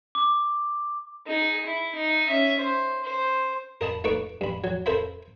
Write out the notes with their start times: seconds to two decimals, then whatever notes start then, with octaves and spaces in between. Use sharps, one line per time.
0.15 D6
1.27 D#4 G#4
1.66 E4
1.95 D#4
2.27 C#4 E5
2.60 C5
3.03 C5
3.81 A#4 D#5 A5 B5
4.04 A3 D#4 B4 C#6 D6
4.41 G2 B5
4.64 F#3
4.86 A4 A#4 C5 E5 B5